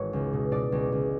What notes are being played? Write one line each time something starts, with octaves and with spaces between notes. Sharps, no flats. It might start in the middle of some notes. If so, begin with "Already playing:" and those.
Already playing: G#1 E3 C#5
C#2
B2
B2 D5
C#2
C#2